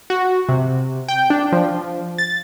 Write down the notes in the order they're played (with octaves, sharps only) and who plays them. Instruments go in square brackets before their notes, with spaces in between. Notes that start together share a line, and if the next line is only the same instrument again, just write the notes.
[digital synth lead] F#4
C3
G5
D4
F3
A6